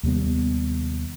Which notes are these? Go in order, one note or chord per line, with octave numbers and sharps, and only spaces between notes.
D#2 C3 G3 B3